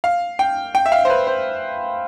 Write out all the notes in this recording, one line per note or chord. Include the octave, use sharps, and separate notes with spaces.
F5
G5
G5
E5
F5
C5
B4
C5